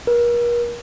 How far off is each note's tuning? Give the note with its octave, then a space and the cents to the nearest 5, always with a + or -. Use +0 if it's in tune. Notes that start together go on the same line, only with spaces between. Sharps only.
A#4 +40